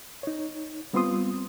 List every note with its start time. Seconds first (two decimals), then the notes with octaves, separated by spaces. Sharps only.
0.23 D#4 C#5
0.93 G3 B3 C4 F4 C6 D#6